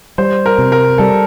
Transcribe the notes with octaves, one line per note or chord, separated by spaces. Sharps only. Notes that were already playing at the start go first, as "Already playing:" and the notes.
G3 C5
A#4
C3
A#4
G3 A4